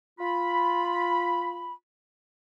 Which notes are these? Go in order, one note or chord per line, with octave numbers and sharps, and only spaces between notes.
F4 B5